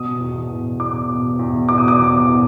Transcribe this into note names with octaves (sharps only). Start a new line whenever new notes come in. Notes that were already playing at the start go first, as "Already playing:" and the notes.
Already playing: B2 D#6
E2
B2
E2 D6
B2
E2
B2 D6
D#6
D6
E2
B2